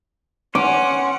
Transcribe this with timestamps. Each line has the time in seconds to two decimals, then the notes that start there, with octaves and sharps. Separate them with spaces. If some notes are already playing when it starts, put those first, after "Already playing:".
0.55 C#4 F#5 C6 D6